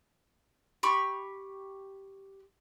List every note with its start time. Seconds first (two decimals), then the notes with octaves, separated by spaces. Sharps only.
0.83 G4 B5 C#6